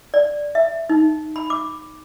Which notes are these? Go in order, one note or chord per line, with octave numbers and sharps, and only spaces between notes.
D5
E5
D#4
B5
D6